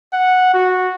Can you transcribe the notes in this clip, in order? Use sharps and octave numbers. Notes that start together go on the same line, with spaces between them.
F#5
F#4